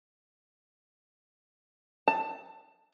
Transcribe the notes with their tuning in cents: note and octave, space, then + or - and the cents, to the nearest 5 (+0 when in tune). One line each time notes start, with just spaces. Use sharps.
A5 +15